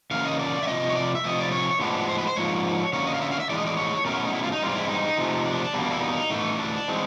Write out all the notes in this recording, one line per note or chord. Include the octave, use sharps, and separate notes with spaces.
C#3 E3 A#3 F5
D#5
D5
E5
C3 F3 G#3 C4 D#5
C#5
D5
E5
C3 F3 A3 D#5
D5
C#5
A2 F3 G#3 B3 D4
C5
B4
C5
G#2 F3 A#3 D4 C#5
D3 F#3 A#3 C#4 C#5
D#5
F5
E5
F5
E5
A2 E3 G#3 D5
D#5
D5
C#5
B2 F#3 A3 C#4 A#4
E4
D#4
E4
F4
D#4
G2 E3 G#3 C4 F4
E4
D#4
C3 F3 A3
D4
E2 B2 G3 A#3
E4
D#4
A2 E3 A3
D4
E3 G#3 C4